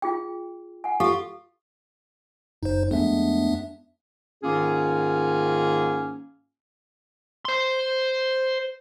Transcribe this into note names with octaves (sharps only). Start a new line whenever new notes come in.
F4 G#4 G5
F#5 G#5
F4 G4 A4 F5
F#1 D#4 C5
F2 G#3 A3 B3 D4 E5
G#2 D#3 A#3 C#4 F4 G#4
C5 C6